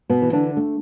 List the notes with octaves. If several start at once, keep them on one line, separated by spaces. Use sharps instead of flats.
B2 B3
E3
D3 D4
A3